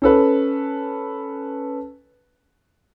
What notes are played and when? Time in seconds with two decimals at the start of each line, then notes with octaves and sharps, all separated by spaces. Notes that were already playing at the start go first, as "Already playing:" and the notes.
0.02 C#4 A4 B4